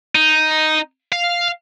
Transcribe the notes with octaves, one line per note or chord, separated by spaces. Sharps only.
D#4
F5